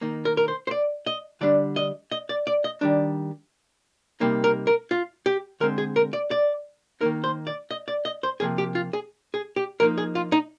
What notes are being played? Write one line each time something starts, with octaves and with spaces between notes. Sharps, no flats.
D#3 A#3 D#4
A#4
A#4
C5
C5
D5
D#5
D3 G3 D4 D5
D#5
D#5
D5
D5
D#5
D#3 G3 D4
C3 G3 A#3 D#4
A#4
A#4
F4
G4
D3 G#3 C4 A#4
G#4
A#4
D5
D5
D#3 A#3 D#4 A#4
C5
D5
D#5
D5
D#5
C5
C3 F3 A#3 G#4
G4
F4
G#4
G#4
G4
F3 A#3 D#4 A#4
G#4
F4
D#4